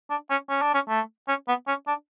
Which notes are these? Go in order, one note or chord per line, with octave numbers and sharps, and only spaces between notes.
D4
C#4
C#4
D4
C#4
A3
C#4
B3
C#4
D4